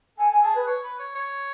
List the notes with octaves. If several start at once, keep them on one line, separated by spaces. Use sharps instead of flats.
A4 G#5
G#5
G#4 A5
B4
C#5
B4
C#5
C#5